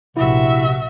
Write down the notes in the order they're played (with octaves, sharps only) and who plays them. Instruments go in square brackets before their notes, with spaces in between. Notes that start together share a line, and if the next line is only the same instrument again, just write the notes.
[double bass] A#1 [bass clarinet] C3 [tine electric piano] E4 [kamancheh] F#4 E5